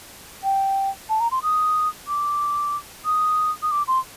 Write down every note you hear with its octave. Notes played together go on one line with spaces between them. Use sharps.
G5
A5
A#5
C6
D#6
D6
D#6
D#6
D6
C6